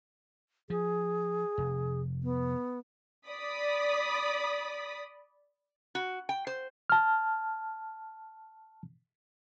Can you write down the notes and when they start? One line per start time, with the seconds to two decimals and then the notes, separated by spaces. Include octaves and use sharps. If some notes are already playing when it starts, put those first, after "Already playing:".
0.70 F3 G#4
1.58 F1
2.23 B3
3.28 D5 B5 D#6 B6
5.95 F#4
6.29 G5
6.47 C5
6.90 A5 F6